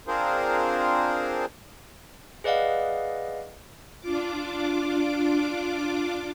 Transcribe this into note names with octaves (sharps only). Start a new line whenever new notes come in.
C4 D4 F4 G#4 A#4 C5
G#4 B4 D5 D#5 F5 F#5
D4 F4 D6